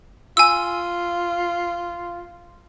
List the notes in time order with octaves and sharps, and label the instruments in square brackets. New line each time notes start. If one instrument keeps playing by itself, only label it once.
[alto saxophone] F4 [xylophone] G#5 E6